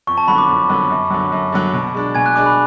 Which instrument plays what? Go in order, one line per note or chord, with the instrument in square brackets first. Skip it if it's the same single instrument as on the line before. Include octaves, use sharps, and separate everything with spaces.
[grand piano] F2 [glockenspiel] C#6
[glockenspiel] A5
[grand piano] D3 F#3 B3 [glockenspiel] B5
[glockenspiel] D6
[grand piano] F2
D3 F#3 B3
F#2
D3 F#3
F#2
D3 F#3
B2
G#3 D4
[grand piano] B2 [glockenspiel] G#5 G#6
[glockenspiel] F#6
[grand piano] G#3 D4 [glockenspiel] D6
[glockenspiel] B5